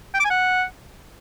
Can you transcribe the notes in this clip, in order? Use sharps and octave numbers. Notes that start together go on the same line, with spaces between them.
G5
D6
G#5
F#5